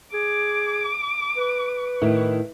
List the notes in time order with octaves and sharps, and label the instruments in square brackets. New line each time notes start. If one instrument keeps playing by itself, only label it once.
[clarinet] G#4 [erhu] D6
[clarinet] B4
[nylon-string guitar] A2 D#3 [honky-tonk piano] E4